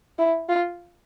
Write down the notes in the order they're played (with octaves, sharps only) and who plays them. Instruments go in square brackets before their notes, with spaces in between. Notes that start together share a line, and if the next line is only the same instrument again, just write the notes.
[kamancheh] E4
F4